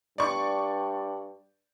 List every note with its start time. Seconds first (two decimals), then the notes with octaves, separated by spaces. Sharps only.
0.18 G2 D5 C#6